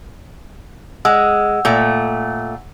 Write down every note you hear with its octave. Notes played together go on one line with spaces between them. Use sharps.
G#3 F#5 E6
A#2 A3